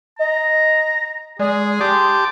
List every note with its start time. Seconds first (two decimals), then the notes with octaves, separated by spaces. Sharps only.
0.19 D#5 A#5
1.39 G#3 G#4 D5
1.81 G4 A5 C6 D6